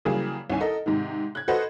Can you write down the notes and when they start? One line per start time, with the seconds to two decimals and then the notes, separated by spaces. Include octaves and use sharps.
0.05 C#3 E3 F#3 G3 A#3 G#4
0.50 C2 D#3 C#4 G#5
0.61 A4 A#4 D#5
0.86 G#2 C3 D#3
1.35 F#6 G#6
1.48 F#4 A4 B4 C5 D#5 F#5